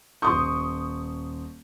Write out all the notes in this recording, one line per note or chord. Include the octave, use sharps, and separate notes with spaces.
D#1 C6 C#6 D#6 G6